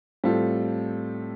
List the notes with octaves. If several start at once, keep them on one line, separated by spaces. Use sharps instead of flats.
A2 G3 C4 F4 A4